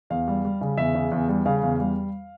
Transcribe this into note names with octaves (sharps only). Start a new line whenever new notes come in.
E2 F5
G3
G3
C#3
E2 E5
C#3
E2
G3
C#3 F5
E2
G3